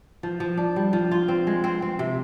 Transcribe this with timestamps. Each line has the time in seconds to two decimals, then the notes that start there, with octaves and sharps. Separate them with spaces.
0.23 F3
0.40 F3
0.57 D4
0.76 G3
0.93 F3
1.11 F4
1.28 C4
1.47 G#3
1.64 C4
1.82 C4
1.99 C3